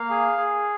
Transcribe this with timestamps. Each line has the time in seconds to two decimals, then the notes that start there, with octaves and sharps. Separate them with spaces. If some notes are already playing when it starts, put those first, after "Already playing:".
Already playing: A#3 F5
0.10 G#4
0.37 G#4